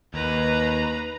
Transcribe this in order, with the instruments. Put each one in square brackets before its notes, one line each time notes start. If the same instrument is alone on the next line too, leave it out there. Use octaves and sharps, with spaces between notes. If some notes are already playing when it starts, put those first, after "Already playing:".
[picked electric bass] D#2 [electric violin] B4 A#5